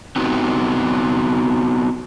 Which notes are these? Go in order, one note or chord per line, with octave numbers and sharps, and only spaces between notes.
B3 C4 D#4 F#4 G4